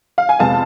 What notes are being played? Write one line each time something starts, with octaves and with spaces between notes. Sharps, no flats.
F5
G#5
F2 C3 G#3 B3 F5 A5